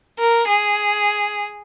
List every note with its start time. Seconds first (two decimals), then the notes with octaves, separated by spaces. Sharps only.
0.18 A#4
0.47 G#4